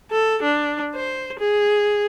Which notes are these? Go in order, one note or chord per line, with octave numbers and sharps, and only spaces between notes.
A4
D4
C5
G#4